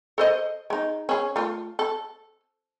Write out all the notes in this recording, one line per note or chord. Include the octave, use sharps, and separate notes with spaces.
A4 C5 D#5
G#3 D#4
C#4 G#4
A3 F4
A4